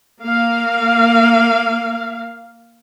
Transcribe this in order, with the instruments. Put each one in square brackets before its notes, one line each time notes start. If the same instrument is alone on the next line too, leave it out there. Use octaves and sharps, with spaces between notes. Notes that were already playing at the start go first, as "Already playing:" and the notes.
[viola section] A#3 F5